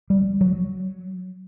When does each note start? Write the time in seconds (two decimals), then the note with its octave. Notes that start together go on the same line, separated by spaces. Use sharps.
0.10 G3
0.41 F#3